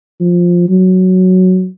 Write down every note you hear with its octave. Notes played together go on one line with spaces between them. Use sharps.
F3
F#3